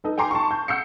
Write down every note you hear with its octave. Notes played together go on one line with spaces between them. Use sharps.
D#4 A4 B4
G5 G#5 A#5 C6 D6 C7
A5 C6 C#6
G6
F#5 E6 G6 C7 C#7